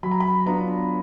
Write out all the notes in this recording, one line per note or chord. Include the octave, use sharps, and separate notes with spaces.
F#3 B5
A#5
B5
B3 D4 F4 A#5